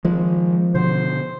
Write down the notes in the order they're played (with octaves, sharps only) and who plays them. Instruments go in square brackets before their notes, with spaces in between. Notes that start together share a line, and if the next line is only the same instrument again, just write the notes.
[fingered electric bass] D#3 G#3 [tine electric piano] F3
[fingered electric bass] B2 D3 [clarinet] C5